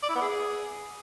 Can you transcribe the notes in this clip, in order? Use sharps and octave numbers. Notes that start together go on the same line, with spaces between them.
D5
E4
B3
G#4